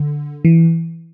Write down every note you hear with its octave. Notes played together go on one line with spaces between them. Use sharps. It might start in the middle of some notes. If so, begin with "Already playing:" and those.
Already playing: D3
E3